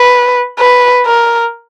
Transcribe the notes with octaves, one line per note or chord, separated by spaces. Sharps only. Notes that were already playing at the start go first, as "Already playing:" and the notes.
Already playing: B4
B4
A#4